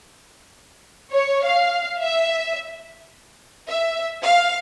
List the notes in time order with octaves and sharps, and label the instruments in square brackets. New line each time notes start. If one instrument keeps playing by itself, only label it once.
[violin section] C#5
F5
E5
E5
F5